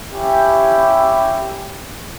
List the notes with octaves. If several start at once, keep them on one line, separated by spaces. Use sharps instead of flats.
C#4 E4 G4